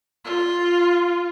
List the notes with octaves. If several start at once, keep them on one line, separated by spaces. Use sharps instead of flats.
F4